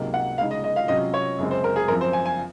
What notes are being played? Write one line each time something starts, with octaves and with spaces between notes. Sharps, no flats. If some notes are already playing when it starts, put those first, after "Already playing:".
Already playing: C#2 C3 F#3 A#3 D#4
F#5
C#3 G#3 D#4 F5
D#5
D#5
F5
C3 F#3 C#4 F4 D#5
C#5
F#2 C#3 G#3 C4
C5
A#4
G#4
F#2 F3 C4 A#4
C5
G#5
G#5